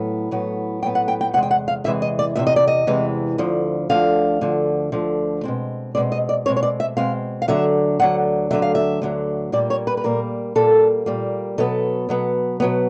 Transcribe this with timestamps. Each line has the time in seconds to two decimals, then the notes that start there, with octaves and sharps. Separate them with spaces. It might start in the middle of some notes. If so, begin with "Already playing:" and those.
Already playing: A2 F#3 B3
0.31 A2 F#3 B3
0.83 A2 F#3 B3 G5
0.95 F#5
1.08 G5
1.21 G5
1.33 E2 C3 G#3 F#5
1.43 G5
1.51 F#5
1.68 F5
1.84 E2 C3 E3 G#3 E5
2.02 D#5
2.19 D5
2.35 E2 C3 E3 G#3 E5
2.47 D#5
2.56 D5
2.68 D#5
2.87 E2 C3 E3 G#3
3.38 D2 D3 F3
3.90 D2 D3 F3 F5
4.41 D2 D3 F3
4.92 D2 D3 F3
5.44 B2 G#3 C4
5.95 B2 G#3 C4 D5
6.12 D#5
6.29 D5
6.46 B2 G#3 C4 C#5
6.57 C#5
6.63 D5
6.80 E5
6.97 B2 G#3 C4 F5
7.42 F5
7.48 D2 D3 F#3 E5
7.99 D2 D3 F#3 F#5
8.51 D2 D3 F#3 E5
8.62 F5
8.75 E5
9.02 D2 D3 F#3
9.52 A#2 G3 A#3 D5
9.70 C#5
9.87 B4
9.97 B4
10.04 A#2 G3 A#3 A#4
10.55 A#2 G3 A#3 A4
11.06 A#2 G3 A#3
11.58 B2 F#3 B3 A4
12.09 B2 F#3 B3
12.60 B2 F#3 B3